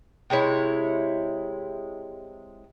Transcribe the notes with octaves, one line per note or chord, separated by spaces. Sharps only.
C3 G#3 E4 C#5